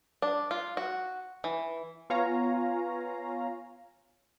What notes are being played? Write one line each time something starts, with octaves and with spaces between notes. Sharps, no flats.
D4
F4
F#4
E3
B3 F4 C#5 F5 G#5 A#5